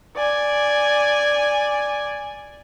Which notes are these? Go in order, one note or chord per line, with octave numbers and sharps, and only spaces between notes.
D5 G#5